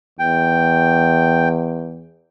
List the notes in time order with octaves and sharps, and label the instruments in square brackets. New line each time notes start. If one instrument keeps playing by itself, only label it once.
[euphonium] E2 [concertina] G5